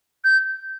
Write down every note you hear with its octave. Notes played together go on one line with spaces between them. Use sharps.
G6